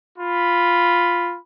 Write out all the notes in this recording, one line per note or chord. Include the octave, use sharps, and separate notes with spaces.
F4 B5